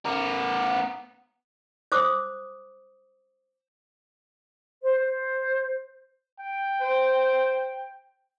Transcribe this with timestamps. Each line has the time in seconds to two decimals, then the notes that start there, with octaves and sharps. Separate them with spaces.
0.06 B3 A#4
1.92 C5 D6 D#6
4.83 C5
5.04 C5
6.40 G5
6.81 C5